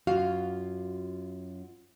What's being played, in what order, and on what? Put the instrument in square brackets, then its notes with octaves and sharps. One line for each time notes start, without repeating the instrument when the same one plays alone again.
[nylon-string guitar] F#2 F4 F#4 F5